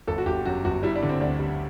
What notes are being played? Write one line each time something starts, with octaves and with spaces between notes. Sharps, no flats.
G1 A4
F#4
G1 G4
F#2 F#4
G1 F#4
G3 E4
D4
D3
C4
D2 D4
G3